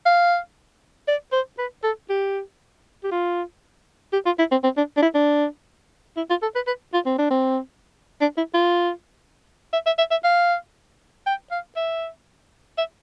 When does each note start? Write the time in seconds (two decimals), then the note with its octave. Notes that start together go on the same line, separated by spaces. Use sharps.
0.06 F5
1.08 D5
1.33 C5
1.58 B4
1.83 A4
2.10 G4
3.04 G4
3.11 F4
4.13 G4
4.26 F4
4.39 E4
4.51 C4
4.64 C4
4.77 D4
4.97 D4
5.02 E4
5.15 D4
6.17 E4
6.30 F4
6.42 A4
6.55 B4
6.67 B4
6.94 F4
7.06 C4
7.18 D4
7.31 C4
8.21 D4
8.37 E4
8.54 F4
9.73 E5
9.86 E5
9.98 E5
10.11 E5
10.24 F5
11.26 G5
11.51 F5
11.76 E5
12.78 E5